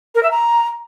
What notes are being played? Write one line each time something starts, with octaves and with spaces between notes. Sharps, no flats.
A#4
E5
A#5